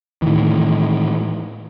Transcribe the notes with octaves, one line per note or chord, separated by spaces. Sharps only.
A2 C3 D#3 E3